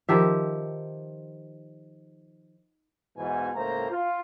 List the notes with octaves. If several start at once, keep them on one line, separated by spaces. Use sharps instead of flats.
D#3 F3 G4 E5
E2 G#2 B2 E3 F#4 G#5
C#2 A2 A3 A#3 C5 A#5
F4